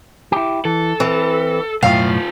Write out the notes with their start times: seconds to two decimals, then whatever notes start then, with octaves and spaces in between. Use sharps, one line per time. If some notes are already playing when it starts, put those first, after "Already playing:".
0.32 E4 G4
0.65 E3 A4
1.00 E3 C4
1.83 B1 F#2 A2 D#3 F4 F5